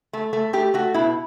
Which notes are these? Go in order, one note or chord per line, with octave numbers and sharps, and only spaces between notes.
A3
A3
A3 G4
A3 F#4
B2 E4